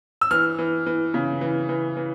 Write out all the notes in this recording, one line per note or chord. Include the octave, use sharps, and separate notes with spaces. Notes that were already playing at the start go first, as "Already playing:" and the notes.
E6
E3 F6
E3
E3
C#3
E3
E3
E3